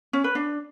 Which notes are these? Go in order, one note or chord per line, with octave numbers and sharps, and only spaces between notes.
C#4
B4
D4